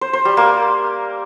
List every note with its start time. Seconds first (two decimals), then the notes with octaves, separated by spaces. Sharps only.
0.01 C5
0.13 C5
0.25 G3
0.37 A#3